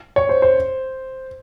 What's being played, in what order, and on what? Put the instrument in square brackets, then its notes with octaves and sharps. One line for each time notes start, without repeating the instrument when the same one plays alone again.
[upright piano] C#5
C5
C5